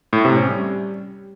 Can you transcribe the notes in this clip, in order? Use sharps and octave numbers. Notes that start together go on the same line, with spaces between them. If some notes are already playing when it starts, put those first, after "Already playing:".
A2
C3
C#4
G3